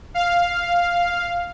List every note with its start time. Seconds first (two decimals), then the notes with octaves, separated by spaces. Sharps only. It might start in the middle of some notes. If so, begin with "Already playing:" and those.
0.14 F5